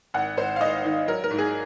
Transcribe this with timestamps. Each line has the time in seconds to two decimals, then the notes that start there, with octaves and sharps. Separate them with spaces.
0.14 G#1 F#5
0.37 G#1 C5
0.56 F5
0.61 G#1 D#5
0.84 D#3
1.08 F#3 A#4
1.24 A#4
1.31 G#2
1.38 G#4